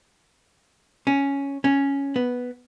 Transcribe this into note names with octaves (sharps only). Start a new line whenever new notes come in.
C#4
C#4
B3